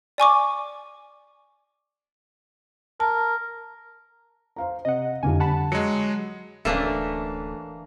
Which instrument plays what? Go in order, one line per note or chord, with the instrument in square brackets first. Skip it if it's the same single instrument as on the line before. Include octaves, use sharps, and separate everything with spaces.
[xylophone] D5 G#5 C#6 D6
[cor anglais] A#4 [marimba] A5
[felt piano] C5 F5 A#5
[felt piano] C3 [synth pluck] D#5 F#5
[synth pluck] F2 A#3 G#5 [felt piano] D3 G3
[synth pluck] F#5 A5 B5
[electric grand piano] F#3 G#3 [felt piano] C#7
[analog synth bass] D1 [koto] E3 A#3 D4 [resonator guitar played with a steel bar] A3 C#4